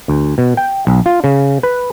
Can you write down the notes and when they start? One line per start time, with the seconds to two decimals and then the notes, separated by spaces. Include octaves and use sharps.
0.08 D2
0.38 B2
0.57 G5
0.87 B1
1.06 F4
1.24 C#3
1.63 B4